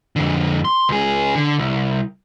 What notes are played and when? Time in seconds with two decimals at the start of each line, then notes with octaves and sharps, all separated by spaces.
0.16 F2 D3
0.65 C6
0.89 C#2 G#4
1.35 D3
1.58 C2